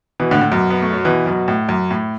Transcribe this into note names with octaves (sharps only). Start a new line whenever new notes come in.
B2 E3
A2 D3
A2
F#2 B2
B3
A3
F#3
B2 E3
F#2 B2
A2
F#2
A2